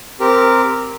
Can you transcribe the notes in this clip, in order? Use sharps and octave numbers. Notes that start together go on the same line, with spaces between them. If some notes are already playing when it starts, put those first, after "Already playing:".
C4 G4 A#4